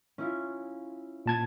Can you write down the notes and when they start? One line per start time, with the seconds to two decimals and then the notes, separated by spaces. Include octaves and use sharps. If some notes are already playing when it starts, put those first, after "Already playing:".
0.18 C#4 E4 F4
1.26 A#2 A5 G#6